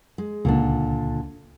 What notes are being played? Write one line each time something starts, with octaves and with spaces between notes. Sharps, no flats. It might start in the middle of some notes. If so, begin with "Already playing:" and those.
G#3
C#2 A#2 D3 D4